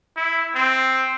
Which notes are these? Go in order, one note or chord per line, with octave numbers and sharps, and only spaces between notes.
E4
C4